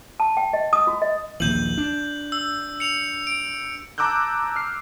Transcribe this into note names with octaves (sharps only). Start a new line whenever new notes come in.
A5
G5
D#5
D#6
F#4
D#5
A#1 D#2 E3 G6 F#7
D4
E6
C#7 F7
D7
A5 A#5 D6 E6 F#6 G6
F6 C7